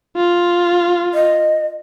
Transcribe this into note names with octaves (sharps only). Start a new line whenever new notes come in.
F4
D#5